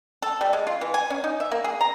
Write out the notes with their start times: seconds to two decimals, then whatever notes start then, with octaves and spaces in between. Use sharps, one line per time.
0.22 A4
0.41 G3
0.53 G#3
0.67 F4
0.81 E3
0.94 G#5
1.10 C#4
1.24 D#4
1.40 E5
1.51 A#3
1.64 G#4
1.81 A#5